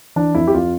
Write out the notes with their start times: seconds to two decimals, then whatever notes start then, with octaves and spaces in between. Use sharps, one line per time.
0.16 E3 D4
0.34 F2 E4
0.47 G4
0.54 F2 F4